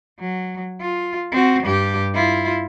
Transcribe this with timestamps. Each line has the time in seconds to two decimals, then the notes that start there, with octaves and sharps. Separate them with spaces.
0.19 F#3
0.81 F4
1.32 C4 F#4
1.63 G2 G4
2.15 E4 F4